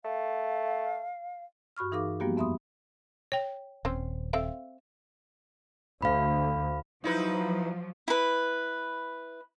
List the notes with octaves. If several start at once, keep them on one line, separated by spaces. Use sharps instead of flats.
A3 F5
G2 F#4 B5 C#6 F6
E3 D#4 G#4 A#4 F5 D6
F3 G3 A#3 B3 F#4 G4
F2 B3 E5 B5 C6 D#6
C#5 G5
D#1 C4 C#4 C5
C4 A4 E5 F5
D2 F5 B5
F3 F#3 D#4 E4 B4
E4 B4